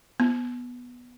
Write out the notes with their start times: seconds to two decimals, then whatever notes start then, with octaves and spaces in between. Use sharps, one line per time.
0.20 B3